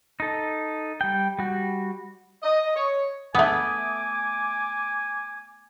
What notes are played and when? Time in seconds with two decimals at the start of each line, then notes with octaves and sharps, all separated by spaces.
0.20 D#4 A4
1.01 G3 G5
1.39 G3 F#4
2.43 D#5
2.75 C#5
3.35 A3 B3 E5 G#5 D6 D#6